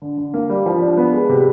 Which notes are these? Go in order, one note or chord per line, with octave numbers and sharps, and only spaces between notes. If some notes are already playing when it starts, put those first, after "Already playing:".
D3
D3
A#3
G3
F3
D4
B3
G#3
C3